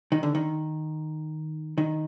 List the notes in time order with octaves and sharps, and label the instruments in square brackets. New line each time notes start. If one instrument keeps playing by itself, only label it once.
[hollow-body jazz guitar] D#3
D3
D#3
D#3